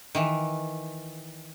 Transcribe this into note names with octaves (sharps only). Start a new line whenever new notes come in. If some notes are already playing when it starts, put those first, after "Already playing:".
D#3 E3